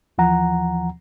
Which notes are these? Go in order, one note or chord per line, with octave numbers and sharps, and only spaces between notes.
D#2 E3 F3 F#5 A#5